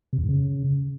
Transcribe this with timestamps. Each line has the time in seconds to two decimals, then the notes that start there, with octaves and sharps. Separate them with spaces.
0.13 C3
0.18 E2
0.23 G#2
0.29 C#3